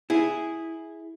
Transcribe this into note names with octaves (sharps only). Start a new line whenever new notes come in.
E4 G#4